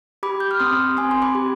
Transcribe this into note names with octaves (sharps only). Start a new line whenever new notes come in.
G4 B5 D6
G6
F6
C4 C6 D#6
C4 G#5 C6
C6
B5 D6
G4